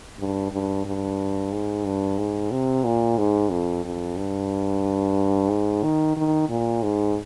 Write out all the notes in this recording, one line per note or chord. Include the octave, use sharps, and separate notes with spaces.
G2
G2
G2
G#2
G2
G#2
C3
A#2
G#2
F2
F2
G2
G#2
D#3
D#3
A#2
G#2